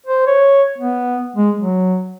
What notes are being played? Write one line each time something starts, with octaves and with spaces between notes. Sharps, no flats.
C5
C#5
B3
G#3
F#3